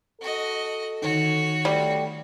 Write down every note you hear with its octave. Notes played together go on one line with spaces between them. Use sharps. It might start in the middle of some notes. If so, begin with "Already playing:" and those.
F#4 A4 D#5
D3 D#3 D#4 F#4 C#5
G3 A3